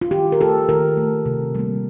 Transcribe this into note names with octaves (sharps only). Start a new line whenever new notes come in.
F4
D#3 G4
A#4
A3 A4
D#3 A#4
A3
C3
G3 A#3